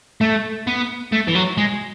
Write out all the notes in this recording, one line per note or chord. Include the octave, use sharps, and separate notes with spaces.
A3
B3
A3
E3
F#3
G#3